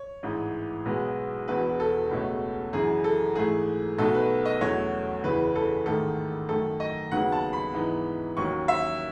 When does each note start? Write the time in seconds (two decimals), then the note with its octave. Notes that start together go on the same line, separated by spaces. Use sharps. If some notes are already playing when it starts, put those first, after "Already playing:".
Already playing: C#5
0.23 A1 G#2 E3
0.85 B1 B2 G#3 B3
1.48 E1 E2 B2 B4
1.80 A4
2.11 C#2 B2 A3 C#4
2.73 F#2 C#3 E3 G#4
3.04 A4
3.35 G#2 E3 A3 G#4
3.98 B1 B2 A3 D#4 A4
4.14 B4
4.45 D#5
4.61 E2 B2 F#3 A3 C#4 C#5
5.23 F#1 E2 C#3 E3 B4
5.56 A4
5.86 A1 G#2 D#3 A3 A4
6.49 F#2 D#3 A3 A4
6.80 D#5
7.11 D#2 C#3 F#3 B3 D#4 F#5
7.32 A5
7.53 B5
7.74 G#2 E3 B3 D#4
8.37 D#2 D#3 F#3 C#4 C#6
8.68 E5